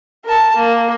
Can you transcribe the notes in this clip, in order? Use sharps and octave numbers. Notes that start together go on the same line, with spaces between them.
A#4 A5
A#3